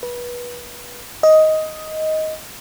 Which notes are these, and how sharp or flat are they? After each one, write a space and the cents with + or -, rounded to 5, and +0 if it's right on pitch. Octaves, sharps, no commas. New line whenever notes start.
B4 -25
D#5 +10